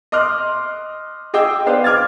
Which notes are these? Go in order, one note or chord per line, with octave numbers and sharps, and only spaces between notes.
D#5 C6 D6 F6 F#6
G#4 D#5 G5 D6 E6
B3 D4 B4 C5 F5
D6 F6 G#6 A6